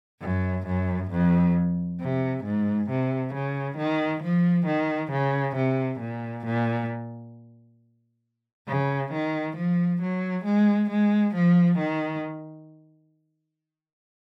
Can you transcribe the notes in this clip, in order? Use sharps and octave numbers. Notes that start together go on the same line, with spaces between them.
F#2
F#2
F2
C3
G#2
C3
C#3
D#3
F3
D#3
C#3
C3
A#2
A#2
C#3
D#3
F3
F#3
G#3
G#3
F3
D#3